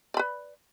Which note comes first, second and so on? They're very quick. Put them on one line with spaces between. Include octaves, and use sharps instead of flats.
D5 B5 B4